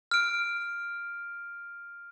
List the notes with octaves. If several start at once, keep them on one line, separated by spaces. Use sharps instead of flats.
F6 D7